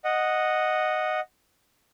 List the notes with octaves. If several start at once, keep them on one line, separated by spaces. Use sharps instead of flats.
D#5 F#5